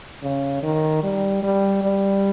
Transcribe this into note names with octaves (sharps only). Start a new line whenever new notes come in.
C#3
D#3
G3
G3
G3